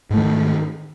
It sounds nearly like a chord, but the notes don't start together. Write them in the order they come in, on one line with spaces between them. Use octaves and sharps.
G#2 A3 D#3